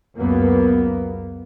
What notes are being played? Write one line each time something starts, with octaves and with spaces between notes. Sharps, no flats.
C#2 F#2 A#3 B3